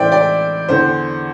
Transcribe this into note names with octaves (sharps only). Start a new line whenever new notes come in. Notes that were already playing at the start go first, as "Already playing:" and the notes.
Already playing: A2 E3 C5 D5 E5 G5
D5 G5
E2 D3 C5